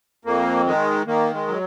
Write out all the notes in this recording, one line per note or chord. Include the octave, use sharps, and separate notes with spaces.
F2 A#3
D#3 G#3
D#3 A#3
G#3
F#3